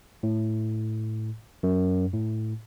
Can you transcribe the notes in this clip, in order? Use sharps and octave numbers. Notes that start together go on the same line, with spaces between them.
A2
F#2
A2